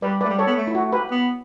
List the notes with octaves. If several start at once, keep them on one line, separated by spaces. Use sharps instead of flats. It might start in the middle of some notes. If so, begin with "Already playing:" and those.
G3 B4 D5
A3 B4 D5
G3
A4 C#5
B3
A3
E4
F#4
G4 B4
B3